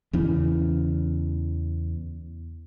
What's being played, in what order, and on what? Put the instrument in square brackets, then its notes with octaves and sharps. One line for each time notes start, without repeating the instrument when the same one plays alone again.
[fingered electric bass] E2 C#3 E3